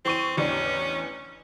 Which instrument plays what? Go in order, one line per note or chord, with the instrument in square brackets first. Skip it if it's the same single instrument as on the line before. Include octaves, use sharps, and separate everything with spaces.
[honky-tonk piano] E3 C#6 D#7 [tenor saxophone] C4
[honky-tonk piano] A1 E2 D4 [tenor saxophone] C#4